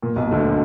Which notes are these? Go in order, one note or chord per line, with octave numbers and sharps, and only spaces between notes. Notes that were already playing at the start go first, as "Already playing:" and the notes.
A#2
B1 B2
D2 D3